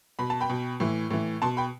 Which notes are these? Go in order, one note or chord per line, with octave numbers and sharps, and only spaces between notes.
B2 B5
A5
G5 B5
B2
A2 E3
A2 E3
B2 A5 C6
G5 B5